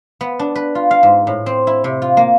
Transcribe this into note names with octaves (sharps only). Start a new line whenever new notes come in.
B3
D4
B4
F4
F5
G#2
A2
C4
E4
C3
F4
A#3